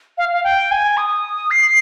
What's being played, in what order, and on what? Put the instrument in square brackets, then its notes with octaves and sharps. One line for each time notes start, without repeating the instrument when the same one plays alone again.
[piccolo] F5
F5
G5
G#5
D#6
C7